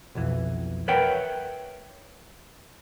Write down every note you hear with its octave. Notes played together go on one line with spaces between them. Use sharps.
B1 F2 E3
A#4 B4 C#5 E5 F#5 G5